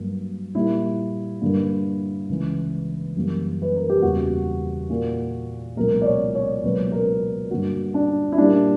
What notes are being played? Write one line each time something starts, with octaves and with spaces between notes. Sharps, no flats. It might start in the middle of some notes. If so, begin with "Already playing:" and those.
Already playing: G2 F#3 A#3
A#2 G3 A#3 E4
G2 D3 A#3
C#2 C#3 E3
F#2 E3 G3 A#3
B4
A#4
G4
E2 C#3 E3 G3 A#3 F#4
A#2 A#3
C#2 B2 F#3 A#3 A#4
D5
C#5
C#5
C#2 B2 F#3 A#3 B4
A#4
G2 D3 A#3 F#4
D4
E4
A#2 G3 A#3 D4